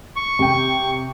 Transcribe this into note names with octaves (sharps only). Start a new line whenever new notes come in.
C#6
C3 G5